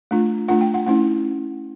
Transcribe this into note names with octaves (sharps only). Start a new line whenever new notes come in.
A3 D4 F4
A3 D4 F4 F#5
G5
F#5
A3 C#4 E4 F#5